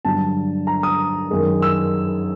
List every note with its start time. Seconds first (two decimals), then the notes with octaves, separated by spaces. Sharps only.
0.05 G2 D3 F#3 A5
0.67 A#5
0.83 D#6
1.30 F#2 D#3 G#3
1.62 E6